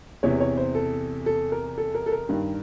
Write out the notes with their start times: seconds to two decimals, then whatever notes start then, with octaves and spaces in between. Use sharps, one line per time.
0.23 E2 C3 E3 C#5
0.40 C#5
0.57 C5
0.75 A4
1.26 A4
1.52 A#4
1.78 A4
1.95 A#4
2.06 A4
2.12 A#4
2.29 G2 D#3